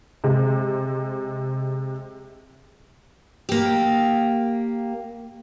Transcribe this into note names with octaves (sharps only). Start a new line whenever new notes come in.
C3 G#3
A#3 G4